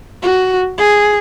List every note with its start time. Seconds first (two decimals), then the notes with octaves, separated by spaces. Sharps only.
0.23 F#4
0.78 G#4